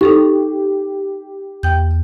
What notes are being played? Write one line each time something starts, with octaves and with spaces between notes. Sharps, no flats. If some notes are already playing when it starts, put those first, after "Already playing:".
D#4 G4 A4 C#6
E2 G5 G6